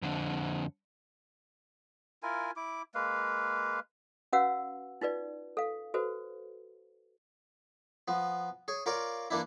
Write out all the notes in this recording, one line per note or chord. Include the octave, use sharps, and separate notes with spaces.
F2 D3
E4 F4 A#4 G#5
E4 D6
G#3 A#3 B4 F5
C#4 F#4 B4 F5 F#5 E6
D#4 F4 B4 D5
A4 F5
F#4 A4 B4 C5
F3 B3
G#4 C#5
F4 A#4 C#5 D5 F5
E3 A#3 D4 E4